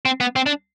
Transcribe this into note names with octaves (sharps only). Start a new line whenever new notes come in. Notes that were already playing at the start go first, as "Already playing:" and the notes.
C4
B3
C4
D4